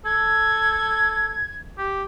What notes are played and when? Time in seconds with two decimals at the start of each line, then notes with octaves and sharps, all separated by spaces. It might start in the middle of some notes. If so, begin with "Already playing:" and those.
0.05 A4 G#6
1.78 G4